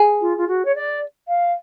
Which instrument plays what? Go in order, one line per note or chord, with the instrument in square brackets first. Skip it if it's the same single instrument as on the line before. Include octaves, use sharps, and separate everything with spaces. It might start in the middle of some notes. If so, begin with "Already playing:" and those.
Already playing: [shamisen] G#4
[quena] F4
F4
F#4
C#5
D5
F5